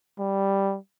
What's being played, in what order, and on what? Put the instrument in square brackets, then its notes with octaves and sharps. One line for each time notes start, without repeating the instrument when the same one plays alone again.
[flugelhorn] G3